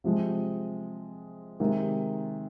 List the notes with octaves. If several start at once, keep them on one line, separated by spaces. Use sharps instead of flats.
C3 F3 G#3
C3 D#3 G#3